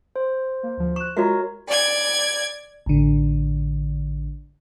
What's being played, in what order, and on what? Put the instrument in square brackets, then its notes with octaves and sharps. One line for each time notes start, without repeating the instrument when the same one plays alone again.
[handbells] C5
[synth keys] A#3
D2 F3
[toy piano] C#6 [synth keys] F#6 E7
[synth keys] G#3 [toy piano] F4 F#4 E5 [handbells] A#4 C#5 A#5
[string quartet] D5 G#6
[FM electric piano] A1 D3